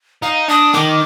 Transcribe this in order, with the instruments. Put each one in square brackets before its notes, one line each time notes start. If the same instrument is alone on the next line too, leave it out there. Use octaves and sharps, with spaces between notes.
[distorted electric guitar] D#4 [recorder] F5
[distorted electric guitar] D4 [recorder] D#6
[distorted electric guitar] D#3 [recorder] D6